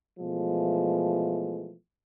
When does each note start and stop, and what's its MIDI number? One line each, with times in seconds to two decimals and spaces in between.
0.19 1.74 47
0.19 1.74 52
0.19 1.74 53
0.19 1.74 56
0.19 1.74 57